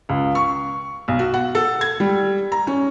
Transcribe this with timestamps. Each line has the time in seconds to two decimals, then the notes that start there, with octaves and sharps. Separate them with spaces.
0.09 C#2
0.35 C#6
1.08 B1
1.19 F#4
1.34 F#5
1.55 A4
1.81 G#6
2.00 G3
2.52 A#5
2.67 C#4